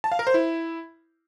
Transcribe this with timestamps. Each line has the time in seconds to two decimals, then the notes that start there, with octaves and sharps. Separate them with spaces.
0.04 A5
0.12 F5
0.19 A#4
0.27 C5
0.34 E4